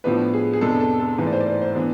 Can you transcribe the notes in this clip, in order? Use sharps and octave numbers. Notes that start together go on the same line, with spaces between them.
A2 F3 B3 D4 B4
G#4
G#4
F2 C3 G#3 B3 D4 A4
A4
A4
G#2 E3 A3 B4
D5
C5
D5
C5
C5
E3 B3 D4